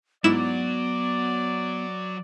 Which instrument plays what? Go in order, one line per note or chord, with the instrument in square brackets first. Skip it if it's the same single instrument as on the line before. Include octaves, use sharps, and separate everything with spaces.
[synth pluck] G#2 E4 E7 [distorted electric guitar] F#3 [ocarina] B3 [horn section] D5